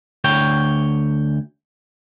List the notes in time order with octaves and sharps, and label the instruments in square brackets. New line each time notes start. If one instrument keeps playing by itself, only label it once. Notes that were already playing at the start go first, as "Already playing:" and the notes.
[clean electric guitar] D2 C#5 G5